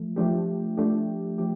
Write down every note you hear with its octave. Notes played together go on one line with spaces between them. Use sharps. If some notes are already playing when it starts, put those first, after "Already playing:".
Already playing: F3 A3
F3 A3 D4 G4
F3 A3 D4 G4
F3 A3 D4 G4